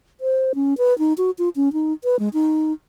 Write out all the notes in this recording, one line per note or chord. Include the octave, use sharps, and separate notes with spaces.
C5
C#4
B4
D#4
F#4
F4
C#4
D#4
B4
G#3
D#4